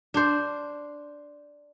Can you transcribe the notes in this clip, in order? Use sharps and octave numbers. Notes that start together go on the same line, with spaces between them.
D4 C5